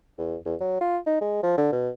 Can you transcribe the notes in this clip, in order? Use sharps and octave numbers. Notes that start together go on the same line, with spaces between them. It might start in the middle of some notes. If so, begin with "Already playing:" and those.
E2
E2
F#3
F4
D#4
G#3
F3
D3
B2